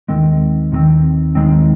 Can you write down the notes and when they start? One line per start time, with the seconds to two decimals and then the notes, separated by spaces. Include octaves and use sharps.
0.08 D#2 D#3 G#3 C4
0.72 D#2 D#3 G#3 C4
1.35 D#2 D#3 G#3 C4